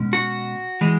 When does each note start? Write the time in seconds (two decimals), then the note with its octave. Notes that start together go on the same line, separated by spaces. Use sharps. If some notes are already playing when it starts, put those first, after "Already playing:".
Already playing: B2 G#3 C#4
0.13 F#4
0.81 E3 G#3